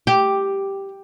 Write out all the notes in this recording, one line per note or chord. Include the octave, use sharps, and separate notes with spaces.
G4